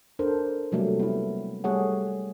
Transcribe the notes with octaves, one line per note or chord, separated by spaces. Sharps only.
D4 A4 A#4 C5
C3 F#3 G3 A3 A#3
B3 E4
G3 A3 G#4 C#5 F#5